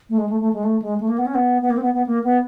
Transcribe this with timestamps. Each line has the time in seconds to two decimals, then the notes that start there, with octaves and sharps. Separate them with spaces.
0.09 A3
0.18 G#3
0.29 A3
0.40 A3
0.53 G#3
0.64 A3
0.82 G#3
1.00 A3
1.09 A#3
1.18 B3
1.26 C#4
1.35 B3
1.62 B3
1.70 A#3
1.77 C4
1.82 B3
1.94 B3
2.07 A#3
2.24 B3